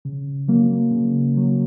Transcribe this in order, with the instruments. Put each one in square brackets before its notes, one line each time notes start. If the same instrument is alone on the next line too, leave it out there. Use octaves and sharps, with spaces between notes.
[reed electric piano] C#3
F#3 A#3
C#3
F#3 A#3